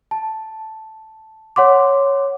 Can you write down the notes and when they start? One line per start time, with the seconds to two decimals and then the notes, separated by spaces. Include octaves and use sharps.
0.11 A5
1.56 C#5 F#5 C6 D6